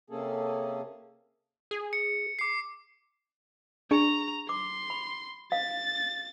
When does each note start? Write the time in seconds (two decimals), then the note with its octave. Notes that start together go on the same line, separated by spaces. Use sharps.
0.10 C3 A#3 C#4 G#4 A4
1.71 G#4
1.93 C#7
2.39 D6 C7
3.91 D4 G#4 A#5 C#6
4.49 C6 D6
4.90 B5
5.52 F5 A6